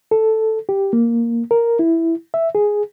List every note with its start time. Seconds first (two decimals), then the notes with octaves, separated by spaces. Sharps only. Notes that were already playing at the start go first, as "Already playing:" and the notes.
0.11 A4
0.69 G4
0.93 A#3
1.51 A#4
1.79 E4
2.34 E5
2.55 G#4